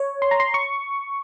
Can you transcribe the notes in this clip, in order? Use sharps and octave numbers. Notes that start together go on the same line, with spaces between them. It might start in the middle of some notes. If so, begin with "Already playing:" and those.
Already playing: C#5
C6
A#5
C6
C#6